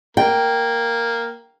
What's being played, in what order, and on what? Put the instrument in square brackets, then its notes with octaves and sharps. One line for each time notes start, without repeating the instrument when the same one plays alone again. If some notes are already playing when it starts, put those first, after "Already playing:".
[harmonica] A#3 [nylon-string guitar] G5